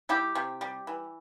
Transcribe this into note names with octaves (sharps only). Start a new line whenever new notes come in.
G3 E4 G4
C3
G3
E3